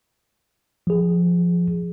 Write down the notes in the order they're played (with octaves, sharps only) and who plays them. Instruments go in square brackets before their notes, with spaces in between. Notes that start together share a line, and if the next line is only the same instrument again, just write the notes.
[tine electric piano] F3 G#4